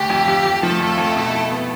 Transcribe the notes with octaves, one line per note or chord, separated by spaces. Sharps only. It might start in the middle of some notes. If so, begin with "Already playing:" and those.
Already playing: D2 G4
F2
F2
F2
F3 A3 A4
F2
F2
B2
E4
B3